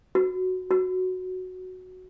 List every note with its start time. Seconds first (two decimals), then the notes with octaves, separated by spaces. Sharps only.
0.15 F#4
0.71 F#4